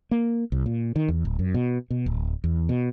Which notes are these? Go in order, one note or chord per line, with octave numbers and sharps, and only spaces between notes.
A#3
C2
A#2
D#3
E2
D1
F#2
B2
B2
D1
E2
B2